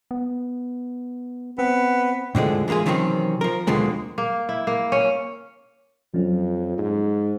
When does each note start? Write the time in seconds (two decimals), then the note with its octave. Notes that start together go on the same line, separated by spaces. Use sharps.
0.11 B3
1.59 B3 C4
2.35 A2 D3 F3 G#3
2.68 E3 G#3 A#3 F4 G#4
2.86 C3 D#3 E3 F#3 C4 C#4
3.41 F3 A#4
3.67 D#2 B2 D3 F3 G#3 A#3
4.18 A#3
4.49 E4
4.67 A#3
4.92 C#4
6.14 F2 F3 F#3 C#4
6.78 G#2